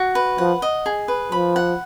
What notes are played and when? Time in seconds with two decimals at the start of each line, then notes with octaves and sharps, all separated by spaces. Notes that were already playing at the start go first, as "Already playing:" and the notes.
Already playing: F#4
0.15 B4
0.38 F3 F#5
0.62 D#5
0.86 G#4
1.08 B4
1.32 F3 B5
1.56 F#5